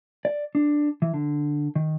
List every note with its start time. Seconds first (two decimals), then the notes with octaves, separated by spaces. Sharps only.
0.25 D5
0.55 D4
1.02 E3
1.14 D3
1.76 D#3